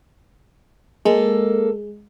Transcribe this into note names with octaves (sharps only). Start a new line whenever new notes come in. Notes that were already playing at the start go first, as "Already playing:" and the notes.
G#3 A#3 A4